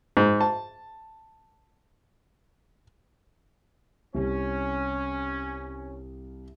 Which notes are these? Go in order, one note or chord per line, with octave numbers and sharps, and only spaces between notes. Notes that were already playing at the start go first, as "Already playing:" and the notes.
G#2
A5
C2 C#4